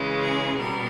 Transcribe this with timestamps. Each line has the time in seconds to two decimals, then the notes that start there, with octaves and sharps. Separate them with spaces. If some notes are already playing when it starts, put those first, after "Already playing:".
Already playing: C#3 E3 G#3
0.19 G#4
0.58 B2 G3 B3 A#4